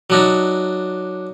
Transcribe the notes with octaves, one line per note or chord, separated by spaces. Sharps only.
F#3 D4 D#4